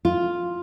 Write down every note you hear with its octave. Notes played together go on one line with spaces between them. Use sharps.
F4